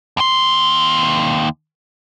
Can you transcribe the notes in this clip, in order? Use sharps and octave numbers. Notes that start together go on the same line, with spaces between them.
D#2 C6